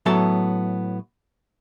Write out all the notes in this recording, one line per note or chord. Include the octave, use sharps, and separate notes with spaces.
A2 F#3 B3 A4 E5 A5